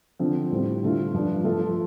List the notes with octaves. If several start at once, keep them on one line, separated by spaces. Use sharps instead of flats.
D3 F3 C4
A2 G3 C4
D3 A3 F4
G2 F3 D4
F3 A3 F4 A4